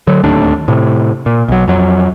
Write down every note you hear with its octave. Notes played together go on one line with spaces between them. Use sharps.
D3 F#3
D1 D#2 A2 D4
A2 C3
A#2
B1 F#3
F2 F#3